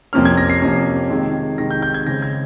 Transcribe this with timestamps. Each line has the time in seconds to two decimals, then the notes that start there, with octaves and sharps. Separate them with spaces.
0.13 F2 C3 F3 A#3 C#4 F6
0.25 G#6
0.37 A#6
0.50 C7
0.62 F2 C3 F3 A#3 C#4
1.10 C3 D#3 G#3
1.58 C3 D#3 G#3 A#6
1.71 G6
1.82 G6
1.94 G#6
2.07 C#3 G#3 C4 A#6
2.22 G#6